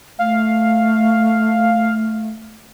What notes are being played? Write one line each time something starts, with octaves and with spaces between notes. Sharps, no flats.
A3 F5